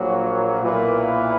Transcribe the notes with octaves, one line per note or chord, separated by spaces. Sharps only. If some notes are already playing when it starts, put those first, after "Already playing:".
Already playing: A#1 A#2 F#3
B1 A#2 A#3 E4 B4